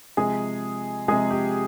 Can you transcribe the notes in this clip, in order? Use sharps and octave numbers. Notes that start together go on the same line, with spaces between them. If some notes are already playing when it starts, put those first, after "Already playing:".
C3 F3 G#3 G#4
C3 F3 G#3 G#4
G4